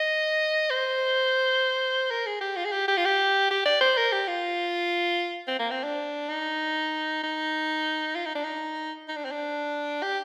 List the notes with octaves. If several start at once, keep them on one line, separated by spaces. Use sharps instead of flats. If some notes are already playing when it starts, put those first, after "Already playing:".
Already playing: D#5
C5
A#4
G#4
G4
F4
G#4
G4
G4
F4
G4
G4
D5
C5
A#4
G4
F4
C4
A#3
C4
D4
D#4
D#4
F4
D#4
D4
D#4
D#4
D4
C4
D4
G4